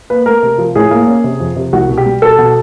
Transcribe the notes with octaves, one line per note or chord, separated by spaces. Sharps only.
A#3 B4
A3 A#4
C3
F3
A2 G#4
A#3
C#4
C3
F2
C3
C2 F#4
B2
G4
G3
B2 A4
B2